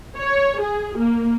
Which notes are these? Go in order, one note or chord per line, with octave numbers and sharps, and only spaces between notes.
C#5
G#4
A#3